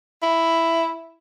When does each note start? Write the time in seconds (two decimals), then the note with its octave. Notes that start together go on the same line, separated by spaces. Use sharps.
0.22 E4